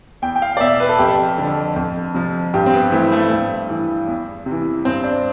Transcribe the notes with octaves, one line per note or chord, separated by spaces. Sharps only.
E2 G5
G5
F5
D5
B2 E5
B4
A4
F2 G4
A4
D3 F3
F2
C3 F3
G2 G4
C4
B3
E3 A3
A3
G2
E3
E2
C3
E3
G2 C4
D4